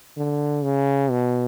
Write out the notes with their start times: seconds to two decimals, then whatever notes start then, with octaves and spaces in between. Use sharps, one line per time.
0.17 D3
0.64 C#3
1.11 B2